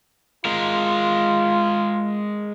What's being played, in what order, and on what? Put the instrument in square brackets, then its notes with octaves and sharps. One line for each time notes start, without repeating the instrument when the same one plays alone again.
[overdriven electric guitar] G#3 A#4 [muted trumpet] F4